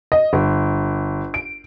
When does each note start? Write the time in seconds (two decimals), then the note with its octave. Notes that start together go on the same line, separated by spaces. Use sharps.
0.12 D#5
0.33 G1
1.34 D7